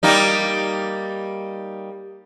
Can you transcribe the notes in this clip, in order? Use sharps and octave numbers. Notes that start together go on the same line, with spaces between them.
G3 A#3 D#4